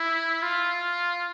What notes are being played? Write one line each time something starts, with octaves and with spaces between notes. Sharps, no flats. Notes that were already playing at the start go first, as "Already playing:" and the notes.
Already playing: E4
F4